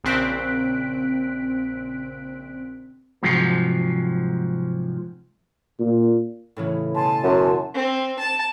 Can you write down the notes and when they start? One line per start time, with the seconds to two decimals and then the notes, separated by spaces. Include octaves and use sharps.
0.04 A#1 C#3 C4 F#6 B6 D7
3.23 G#2 C3 F3 F#3
5.80 A#2
6.56 A2 C#3 E3
6.94 B2 G#5 A5 C6
7.23 F#2
7.75 C4
8.19 A5